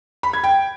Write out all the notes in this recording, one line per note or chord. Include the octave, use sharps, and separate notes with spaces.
B5
G#6
G5